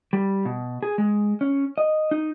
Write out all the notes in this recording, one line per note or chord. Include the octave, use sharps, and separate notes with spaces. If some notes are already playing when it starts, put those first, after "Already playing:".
G3
B2
G#4
G#3
C#4
D#5
D#4